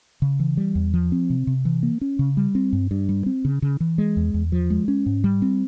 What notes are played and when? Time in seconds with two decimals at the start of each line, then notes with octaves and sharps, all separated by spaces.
0.22 C#3
0.40 E3
0.57 G3
0.75 E2
0.94 F3
1.12 C4
1.30 C3
1.47 C3
1.65 E3
1.83 A#3
2.01 C#4
2.19 C#3
2.37 G3
2.55 C4
2.73 G2
2.91 G2
3.09 G3
3.26 C4
3.45 C#3
3.62 C#3
3.80 E3
3.98 G#3
4.17 E2
4.34 E2
4.52 F3
4.70 G#3
4.88 C#4
5.06 G#2
5.24 G3
5.42 C4